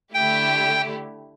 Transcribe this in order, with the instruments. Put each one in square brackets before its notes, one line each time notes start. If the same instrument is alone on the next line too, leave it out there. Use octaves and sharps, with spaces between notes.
[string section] D3 A3 E4 G4 [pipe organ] G5